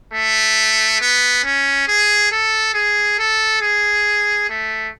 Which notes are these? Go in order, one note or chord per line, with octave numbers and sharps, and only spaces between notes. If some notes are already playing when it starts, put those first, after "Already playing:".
A3
B3
C#4
G#4
A4
G#4
A4
G#4
A3